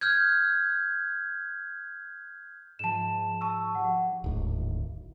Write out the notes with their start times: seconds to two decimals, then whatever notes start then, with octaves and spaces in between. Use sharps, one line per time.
0.01 F6 G6 G#6
2.79 G#2 F3 A5 E7
3.41 A5 C#6 E6
3.75 F3 G4 C#5 F#5
4.24 D1 G#1